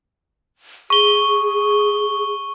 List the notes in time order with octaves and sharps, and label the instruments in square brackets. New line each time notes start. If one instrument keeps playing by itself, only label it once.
[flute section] G#4 [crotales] C#6 G7